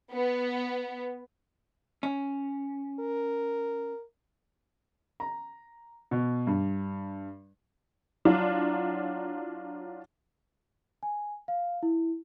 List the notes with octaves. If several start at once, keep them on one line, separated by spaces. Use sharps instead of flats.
B3
C#4
A#4
A#5
B2
G2
F#3 D4 E4 F4
G#5
F5
E4